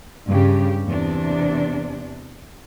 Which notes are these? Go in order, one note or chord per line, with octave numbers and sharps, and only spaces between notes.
G2 C#3 G4
E2 C3 D4